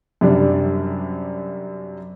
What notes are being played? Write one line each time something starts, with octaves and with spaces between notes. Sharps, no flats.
F#2 C3 G3 D4